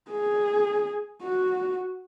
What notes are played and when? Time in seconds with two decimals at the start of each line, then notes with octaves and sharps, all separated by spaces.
0.11 G#4
1.23 F#4